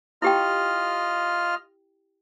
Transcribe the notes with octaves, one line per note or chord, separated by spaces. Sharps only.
E4 F4 G4 D#5 G5 F6